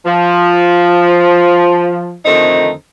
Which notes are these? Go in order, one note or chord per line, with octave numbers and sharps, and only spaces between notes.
F3
F2 D3 D#3 A3 C4 D#4